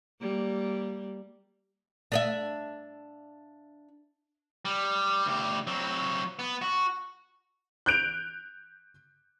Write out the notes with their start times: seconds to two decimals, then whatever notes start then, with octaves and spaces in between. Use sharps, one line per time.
0.20 G3 A#3
2.12 D4 D#5 E5
4.65 G3
5.26 D2 G4
5.67 F#3 C4
6.39 B3
6.62 F#4
7.86 F#6 G6 D7 F7